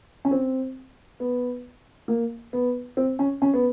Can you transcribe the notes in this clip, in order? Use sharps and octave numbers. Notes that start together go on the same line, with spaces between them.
C#4
C4
B3
A#3
B3
C4
C#4
C#4
B3